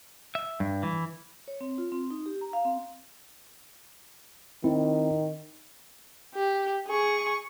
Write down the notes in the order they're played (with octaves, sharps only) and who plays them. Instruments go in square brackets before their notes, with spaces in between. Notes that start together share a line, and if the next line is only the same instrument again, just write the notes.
[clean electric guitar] E5
G2
E3
[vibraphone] C#5
C4
F4
C4
D#4
G4
A#5
F5
C4
[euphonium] D#3 [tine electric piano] C4 E4
[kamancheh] G4
G#4 C#6